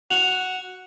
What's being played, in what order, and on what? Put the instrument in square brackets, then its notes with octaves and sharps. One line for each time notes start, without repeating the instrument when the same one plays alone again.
[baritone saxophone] F#4 [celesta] F7 F#7